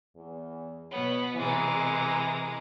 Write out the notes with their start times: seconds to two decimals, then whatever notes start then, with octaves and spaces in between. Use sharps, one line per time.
0.16 E2
0.92 B2 B3 C#5
1.36 C3 E3 G#3 A#4